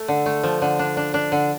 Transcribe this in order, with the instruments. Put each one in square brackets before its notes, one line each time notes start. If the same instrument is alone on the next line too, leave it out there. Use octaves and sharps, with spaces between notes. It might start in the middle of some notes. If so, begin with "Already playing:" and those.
Already playing: [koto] A3
D3
A3
F3
D3
D4
D4
D4
D3